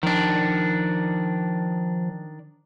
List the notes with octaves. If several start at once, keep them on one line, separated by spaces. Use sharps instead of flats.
D#3 F3 D4